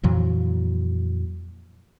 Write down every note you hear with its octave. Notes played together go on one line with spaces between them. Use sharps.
F2 A#2 E3 F#3